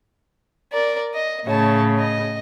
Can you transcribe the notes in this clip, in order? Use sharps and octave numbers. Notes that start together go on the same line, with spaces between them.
A#4 D5
D#5
A2 C#3 C#5 A5
D#5